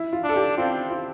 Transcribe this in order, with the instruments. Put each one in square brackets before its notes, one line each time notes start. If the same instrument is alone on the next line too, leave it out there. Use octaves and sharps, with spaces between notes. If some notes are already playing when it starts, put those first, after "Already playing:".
Already playing: [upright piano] E4
F4
[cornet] D4
[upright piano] A4
G4
[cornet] C4 [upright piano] F4
[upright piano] F4